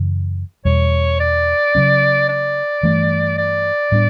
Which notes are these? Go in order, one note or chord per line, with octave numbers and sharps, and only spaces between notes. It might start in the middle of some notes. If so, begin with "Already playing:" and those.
Already playing: F#2 C#3 E3
E2 B2 G3 C#5
D5
C#3 F#3 C#4
D5
G2 E3 A3
D5
A2 G3 B3 D4